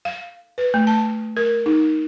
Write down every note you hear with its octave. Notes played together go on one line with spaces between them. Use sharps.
F5
B4
A3
A5
A#4
D#4